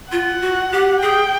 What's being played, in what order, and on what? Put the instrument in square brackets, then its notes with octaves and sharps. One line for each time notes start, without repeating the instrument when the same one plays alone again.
[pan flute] F4 [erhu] F#5
[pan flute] F#4
G4
[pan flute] G#4 [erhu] G5